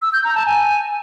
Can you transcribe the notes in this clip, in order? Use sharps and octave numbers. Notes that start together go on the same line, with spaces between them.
E6
G6
A#5
A5
G#5